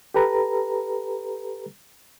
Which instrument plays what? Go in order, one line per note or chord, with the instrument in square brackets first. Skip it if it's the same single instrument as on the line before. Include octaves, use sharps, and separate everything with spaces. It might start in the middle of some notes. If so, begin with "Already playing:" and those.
[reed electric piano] G4 A4 B4 A#5